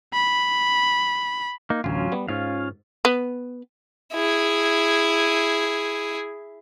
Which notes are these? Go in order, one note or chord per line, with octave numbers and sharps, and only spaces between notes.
B5
A#3 D#4
A1 D2 F#3 C#4 F4
G3 B3
G#2 C#4 F4 F5
B3
E4 G#4